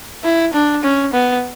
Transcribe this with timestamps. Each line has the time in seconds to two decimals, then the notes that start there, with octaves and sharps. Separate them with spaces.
0.24 E4
0.53 D4
0.83 C#4
1.13 B3